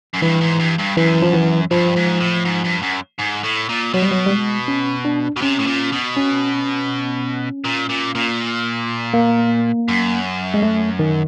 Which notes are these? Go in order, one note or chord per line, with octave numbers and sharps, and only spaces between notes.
F#2
G2 E3
G#2
G2
G2
F#2 E3
F3
E3
G2 F3
G#2
A2
G#2
G2
F#2
G#2
A2
A#2
B2 F#3
G3
F#3
G3
G#3
C#4
D4
B2
C3 C#4
A2
A#2
B2
C#4
A#2
A#2
A#2
A#3
F#2
G#3
A3
D#3